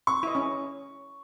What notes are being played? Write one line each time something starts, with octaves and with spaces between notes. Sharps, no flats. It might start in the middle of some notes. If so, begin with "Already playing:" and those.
C#6
E4 D#5
C#4 E4